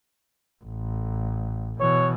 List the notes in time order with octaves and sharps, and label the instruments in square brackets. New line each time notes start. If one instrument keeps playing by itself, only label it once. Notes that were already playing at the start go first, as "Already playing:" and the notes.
[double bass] A1
[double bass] B2 E3 [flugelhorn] C#5